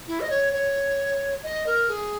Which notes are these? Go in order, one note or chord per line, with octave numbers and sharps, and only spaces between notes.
E4
D#5
C#5
C#5
D#5
A#4
G#4